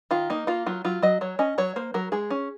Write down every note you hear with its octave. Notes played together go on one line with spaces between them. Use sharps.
D#3 F4
A#3 D#4
A#3 F4
F#3 F4
F#3 F4
F#3 D#5
F#3 C#5
C#4 D#5
F#3 C#5
A#3 C5
F#3 A#4
G#3 G#4
C#4